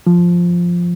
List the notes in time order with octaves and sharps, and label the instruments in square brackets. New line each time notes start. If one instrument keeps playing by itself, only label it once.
[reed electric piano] F3